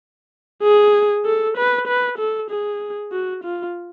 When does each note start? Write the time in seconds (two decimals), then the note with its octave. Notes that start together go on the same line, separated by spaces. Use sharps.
0.63 G#4
1.26 A4
1.57 B4
1.87 B4
2.18 A4
2.50 G#4
3.12 F#4
3.44 F4